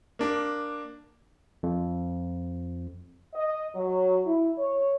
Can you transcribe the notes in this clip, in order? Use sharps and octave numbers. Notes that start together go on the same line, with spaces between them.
A#3 D4
F2
D#5
F#3
E4
C#5